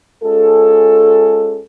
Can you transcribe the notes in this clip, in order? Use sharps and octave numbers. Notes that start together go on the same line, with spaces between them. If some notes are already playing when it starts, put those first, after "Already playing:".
G#3 C#4 F4 G#4 A4